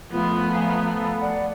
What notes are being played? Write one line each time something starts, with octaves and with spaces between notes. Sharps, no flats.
F3 A3 B3 F4
F5 G#5 A#5
A4 F5 A#5
D5 F#5